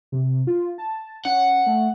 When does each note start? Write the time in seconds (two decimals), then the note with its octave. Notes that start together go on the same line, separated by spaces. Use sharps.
0.12 C3
0.47 F4
0.78 A5
1.25 C#4 F#5
1.66 A3